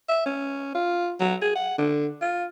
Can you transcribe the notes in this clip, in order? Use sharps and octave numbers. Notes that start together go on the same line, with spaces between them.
E5
C#4
F4
F#3
G#4
F#5
D3
F4